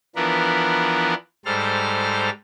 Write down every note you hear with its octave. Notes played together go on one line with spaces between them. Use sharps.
E3 F3 B3 D4 A#4 B4
G#2 G3 A4 C5 F6